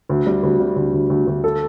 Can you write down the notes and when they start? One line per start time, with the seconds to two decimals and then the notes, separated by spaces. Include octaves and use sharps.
0.09 D2
0.27 G3
0.43 D2
0.60 G3
0.76 D2
0.94 D2
1.10 D2
1.27 D2
1.44 A4